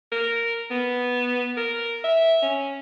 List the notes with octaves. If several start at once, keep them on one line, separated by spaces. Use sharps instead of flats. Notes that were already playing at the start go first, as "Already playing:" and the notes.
A#4
B3
A#4
E5
C#4